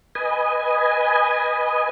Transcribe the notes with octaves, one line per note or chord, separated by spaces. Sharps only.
B4 D#5 G#5